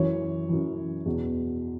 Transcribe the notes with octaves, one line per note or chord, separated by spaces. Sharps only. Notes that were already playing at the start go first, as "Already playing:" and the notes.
Already playing: F#2 E3 C#5
F#2 E3
E2 B2